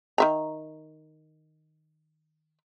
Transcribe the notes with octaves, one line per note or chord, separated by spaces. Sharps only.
D#3 E5 A#5